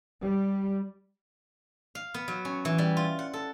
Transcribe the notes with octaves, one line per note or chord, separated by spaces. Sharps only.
G3
F5
B3
F#3
C#4
E3
G3
F4
F#5
A4